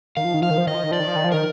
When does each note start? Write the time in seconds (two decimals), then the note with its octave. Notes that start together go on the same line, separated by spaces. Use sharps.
0.17 D#3 F5
0.25 F3
0.34 D#3
0.42 F3 F5
0.51 D#3
0.58 F3
0.67 D#3 D#5
0.75 F3
0.83 D#3
0.91 F3 D5
1.00 D#3
1.08 F3
1.16 D#3
1.24 F3
1.32 D#3 A#4